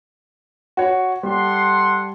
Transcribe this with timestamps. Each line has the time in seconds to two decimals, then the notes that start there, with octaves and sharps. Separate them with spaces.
0.77 F#4 C#5
1.23 G3 A4 F#5 C6